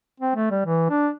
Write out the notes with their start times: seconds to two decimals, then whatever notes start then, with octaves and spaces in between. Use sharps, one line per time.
0.20 C4
0.35 A3
0.51 G3
0.66 E3
0.90 D4